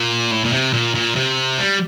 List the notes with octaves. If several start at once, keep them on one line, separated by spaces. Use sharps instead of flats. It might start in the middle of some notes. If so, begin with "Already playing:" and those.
Already playing: A#2
A2
A#2
C3
A#2
A#2
C3
G3